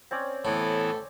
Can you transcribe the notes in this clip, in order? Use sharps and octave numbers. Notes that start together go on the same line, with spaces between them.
C4 C#4 D5
A2 E3 B3 E4 A4